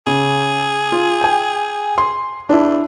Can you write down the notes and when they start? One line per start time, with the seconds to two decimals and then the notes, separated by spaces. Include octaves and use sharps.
0.07 C#3 G#4
0.92 F4
1.21 G5 G#5
1.98 C6
2.49 E2 D4 E4